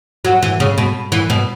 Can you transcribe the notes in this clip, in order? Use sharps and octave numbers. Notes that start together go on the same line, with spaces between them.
F#3
E3
C#3
B2
E3
B2